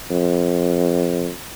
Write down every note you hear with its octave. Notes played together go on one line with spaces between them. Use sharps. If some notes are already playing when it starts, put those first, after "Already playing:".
F2